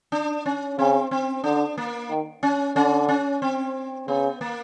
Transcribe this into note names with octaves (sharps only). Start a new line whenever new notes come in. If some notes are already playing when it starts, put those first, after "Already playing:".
D4
C#4
C#3 C4
C4
D3 D4
A#3
D#3
C#4
D3 C#4
C#4
C4
C#3 B3
A#3